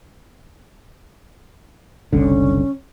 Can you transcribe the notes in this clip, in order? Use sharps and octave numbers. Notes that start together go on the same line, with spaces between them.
F#1 C2 D3 C#4